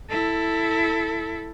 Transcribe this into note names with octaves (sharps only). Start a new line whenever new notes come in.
E4 A4